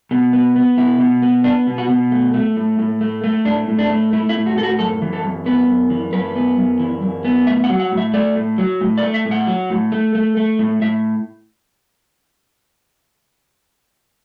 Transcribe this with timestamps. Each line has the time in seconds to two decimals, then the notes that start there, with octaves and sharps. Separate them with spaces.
0.11 B2
0.33 B3
0.56 B3
0.77 B2 E4
1.00 B2
1.22 B3
1.44 B3 D4
1.67 B2
1.78 F#4
1.90 B2
2.12 A3
2.34 A3
2.57 A2
2.79 A2
3.01 A3
3.24 A3
3.45 A2 D4
3.68 A2
3.79 D4
3.90 A3
4.13 A3 E4
4.29 E4
4.35 A2
4.46 F#4
4.56 A2 A4
4.63 F#4
4.79 F#2 A4
5.02 E3
5.13 A4
5.24 F#2
5.46 B3 B4
5.68 F#2
5.90 E3
6.13 F#2 B4
6.36 B3
6.58 F#2
6.79 E3
7.02 F#2
7.25 B3
7.47 A2 E5
7.64 F#5
7.70 F#3
7.80 F#5
7.92 A2
7.97 E5
8.14 A3 D5
8.36 A2
8.58 F#3
8.81 A2
8.98 D5
9.03 A3
9.14 E5
9.26 A2
9.31 F#5
9.47 F#3
9.70 A2
9.92 A3
10.15 A3
10.37 A3
10.59 A2
10.82 A2 E5